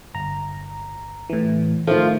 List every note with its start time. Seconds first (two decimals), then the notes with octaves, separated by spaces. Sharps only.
0.14 G1 A#5
1.29 A2 E3
1.87 D#3 F3 A3 F4